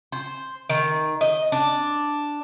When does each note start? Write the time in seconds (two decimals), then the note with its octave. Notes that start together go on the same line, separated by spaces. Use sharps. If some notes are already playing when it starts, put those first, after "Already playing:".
0.12 C5
0.69 D#3
1.21 D#5
1.52 D4